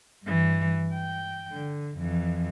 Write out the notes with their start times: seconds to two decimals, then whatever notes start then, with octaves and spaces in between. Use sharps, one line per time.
0.24 G2 E3
0.94 G5
1.52 D3
1.98 F2 E3